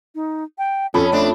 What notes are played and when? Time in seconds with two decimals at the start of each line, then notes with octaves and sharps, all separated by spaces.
0.15 D#4
0.58 G5
0.94 F2 C#4 A4 B5
1.12 A3 C4 D4